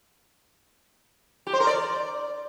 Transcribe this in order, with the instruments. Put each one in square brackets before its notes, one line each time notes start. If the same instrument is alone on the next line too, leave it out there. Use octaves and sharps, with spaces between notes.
[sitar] G4
C5
A#4
D5